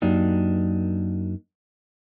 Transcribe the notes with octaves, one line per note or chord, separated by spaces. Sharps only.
F#2 F#3 A#3 D4 D#4 G4